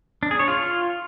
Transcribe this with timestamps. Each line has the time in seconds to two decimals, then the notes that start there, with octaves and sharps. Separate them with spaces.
0.23 D4
0.31 G#4
0.39 C#5
0.48 F4